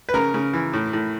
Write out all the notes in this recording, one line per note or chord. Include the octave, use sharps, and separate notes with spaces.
B4
C#3 A#4
C#3
E3
A2
A2